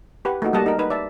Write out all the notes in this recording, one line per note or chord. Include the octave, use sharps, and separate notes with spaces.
G4 B4 F#5
A3 A#3 D#4 F#4
G3 A#3 A4 D#5 F#5 A5
D#4 A#4
D#4 B4
D5 E5 A5